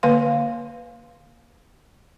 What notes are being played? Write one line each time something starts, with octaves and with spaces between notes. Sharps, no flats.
D3 A#3 B4 F5 C6